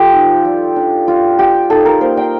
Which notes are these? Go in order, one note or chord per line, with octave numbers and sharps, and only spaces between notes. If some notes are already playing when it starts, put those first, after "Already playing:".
Already playing: F3 F4 G4 A4
D#4
G3
D4
G3 F4
F4 G4
D#4 A4
A#4
A#3 C5
G5